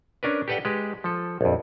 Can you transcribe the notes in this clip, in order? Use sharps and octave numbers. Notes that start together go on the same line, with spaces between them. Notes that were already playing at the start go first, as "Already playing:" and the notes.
C#4 D4 A#4 B4
G4 A4 B4 D5 F#5 G5
G#3 G4 B4
F3 A4
A#1 F2